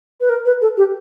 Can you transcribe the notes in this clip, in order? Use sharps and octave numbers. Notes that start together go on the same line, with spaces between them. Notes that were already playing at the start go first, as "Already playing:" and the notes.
B4
A#4
B4
A4
G4